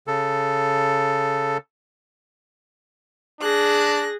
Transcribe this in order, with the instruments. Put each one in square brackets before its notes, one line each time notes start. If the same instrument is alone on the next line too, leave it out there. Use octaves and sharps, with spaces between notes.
[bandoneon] C#3 A4
[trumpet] D4 [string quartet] G#4 F#6 A#6